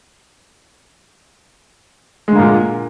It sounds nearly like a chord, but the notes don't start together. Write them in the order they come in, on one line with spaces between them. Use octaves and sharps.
G#3 D3 A#3 A#2